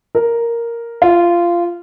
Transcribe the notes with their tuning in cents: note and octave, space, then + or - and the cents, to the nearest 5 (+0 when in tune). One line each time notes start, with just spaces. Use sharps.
A#4 +0
F4 -15